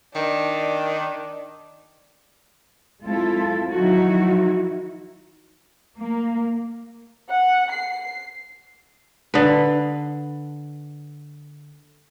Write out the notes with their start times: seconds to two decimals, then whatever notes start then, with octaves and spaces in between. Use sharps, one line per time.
0.15 D#3 D4
3.04 G#3 C4 E4 F4 A4
3.72 D#3 F3 F#3 D#4 E4 F#4
5.98 A#3
7.29 F#5
7.71 C7
9.34 D3 B4